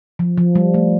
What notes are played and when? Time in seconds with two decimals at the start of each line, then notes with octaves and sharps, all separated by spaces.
0.19 F3
0.38 F3
0.55 G3
0.74 A3